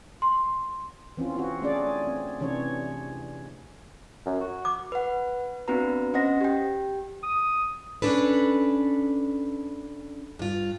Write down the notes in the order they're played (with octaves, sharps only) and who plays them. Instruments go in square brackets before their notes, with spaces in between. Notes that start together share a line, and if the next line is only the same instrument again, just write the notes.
[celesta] C6
[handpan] E3 C4 C#4 F4
C4 F4 F#4
A3 C#4 D4 G#4 D5
C4
C3 E3 C#4 D4 C#5
[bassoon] F#2
F#4
[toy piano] D6
[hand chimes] B4 F#5
B3 C4 D4 F#4 B4 A#5
C#4 C5 D#5 F#5 A#6
G4 G5
[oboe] D#6
[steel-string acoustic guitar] C#4 D4 A4 B4
G2 F4